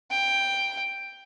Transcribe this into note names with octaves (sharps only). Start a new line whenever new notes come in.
G5